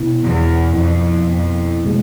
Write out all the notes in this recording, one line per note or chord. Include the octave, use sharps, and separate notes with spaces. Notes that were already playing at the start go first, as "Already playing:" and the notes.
Already playing: B2 B3 E4
E2
F2
F2
B2 G#3